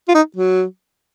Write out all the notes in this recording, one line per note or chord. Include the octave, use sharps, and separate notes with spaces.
F4
D#4
F#3